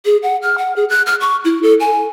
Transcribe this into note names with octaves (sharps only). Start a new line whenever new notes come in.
G#4
F#5
F6
F#5
G#4
F#6
F6
C#6
E4
A4
G#5